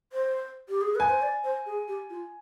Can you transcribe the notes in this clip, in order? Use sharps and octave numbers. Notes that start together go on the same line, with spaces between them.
C5
G4
G#4
B4 G#5
C5
D5
C5
G#4
G4
F4